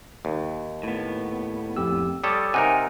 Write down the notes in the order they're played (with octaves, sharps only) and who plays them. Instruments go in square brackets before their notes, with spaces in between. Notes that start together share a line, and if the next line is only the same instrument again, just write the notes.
[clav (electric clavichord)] D#2
[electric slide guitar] A2 B3
[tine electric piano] F2 G4 E6
[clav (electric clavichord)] G3 A4 C#5 [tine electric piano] D6 D#6
[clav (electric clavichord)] C3 D#4 A#4 [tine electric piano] F#5 [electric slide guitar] G#5